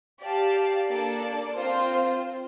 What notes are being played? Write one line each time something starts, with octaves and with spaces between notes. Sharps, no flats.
G4 D5 F5 A5
A#3 D4 A4 D5 A5
C4 F4 C5